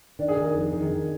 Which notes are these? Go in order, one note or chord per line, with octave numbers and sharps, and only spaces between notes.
D#3 D4
G#4
D#3 A#4
G#4
F2
D#3
D#3